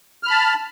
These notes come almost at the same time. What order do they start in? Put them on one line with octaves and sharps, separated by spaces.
F6 B5 A5